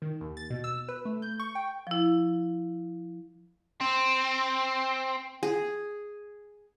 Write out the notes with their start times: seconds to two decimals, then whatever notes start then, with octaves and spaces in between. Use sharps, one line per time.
0.02 D#3
0.21 D#2
0.37 A6
0.50 B2
0.64 E6
0.88 B4
1.05 A3
1.22 G6
1.40 C#6
1.55 G5
1.87 F3 E4
3.81 C4
5.43 G#4